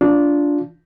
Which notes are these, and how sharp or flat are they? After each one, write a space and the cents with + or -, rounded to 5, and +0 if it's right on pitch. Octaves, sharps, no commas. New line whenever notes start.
D4 -15 F4 +0